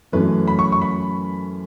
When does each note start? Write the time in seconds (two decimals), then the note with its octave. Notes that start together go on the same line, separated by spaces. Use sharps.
0.12 F#2 E3 A3 C#4 B4
0.48 B5
0.59 C#6
0.72 C#6
0.81 B5